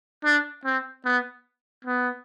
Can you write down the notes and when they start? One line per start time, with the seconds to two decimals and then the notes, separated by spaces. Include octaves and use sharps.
0.25 D4
0.65 C4
1.05 B3
1.85 B3